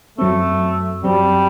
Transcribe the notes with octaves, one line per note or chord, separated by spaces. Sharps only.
F#2 F#3 A3 C4
F#2 F#3 G3 C4